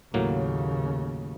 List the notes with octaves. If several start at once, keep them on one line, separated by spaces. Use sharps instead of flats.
D#2 A2 C#3 F#3 A#3